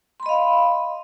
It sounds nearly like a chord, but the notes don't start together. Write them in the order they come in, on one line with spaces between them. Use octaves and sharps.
C6 B5 D#5 F5